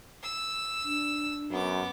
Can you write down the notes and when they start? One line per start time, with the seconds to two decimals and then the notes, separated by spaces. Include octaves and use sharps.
0.23 E6
0.84 D4
1.51 F#2 B3 D6